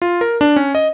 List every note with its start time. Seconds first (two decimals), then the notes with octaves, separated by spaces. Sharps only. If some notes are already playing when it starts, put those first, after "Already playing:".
0.02 F4
0.21 A#4
0.41 D4
0.56 C#4
0.75 D#5